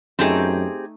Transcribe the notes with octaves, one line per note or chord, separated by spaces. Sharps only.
F#2 A3 C4 D#4 G4 G#4